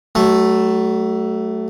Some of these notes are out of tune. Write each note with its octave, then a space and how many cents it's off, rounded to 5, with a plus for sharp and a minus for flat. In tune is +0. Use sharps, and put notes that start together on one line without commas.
F#3 +35 A3 +0